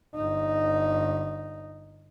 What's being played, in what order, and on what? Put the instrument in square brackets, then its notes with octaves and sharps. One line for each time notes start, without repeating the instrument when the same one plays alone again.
[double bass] G1 D#4